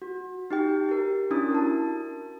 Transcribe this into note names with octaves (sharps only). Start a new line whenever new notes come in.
F#4
D#4 G4 G5
G4 A#4
C#4 D4 E4 F#4 D#6 A6
A#4 A5